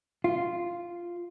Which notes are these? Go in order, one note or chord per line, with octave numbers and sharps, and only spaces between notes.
F4